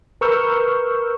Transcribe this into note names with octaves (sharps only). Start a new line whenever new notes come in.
A#4 B4 C#6 E6 F6 G6